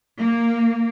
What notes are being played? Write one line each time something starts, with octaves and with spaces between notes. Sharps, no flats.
A#3